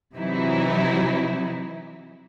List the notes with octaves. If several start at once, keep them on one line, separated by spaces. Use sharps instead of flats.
C3 E3 F#3 D#4 E4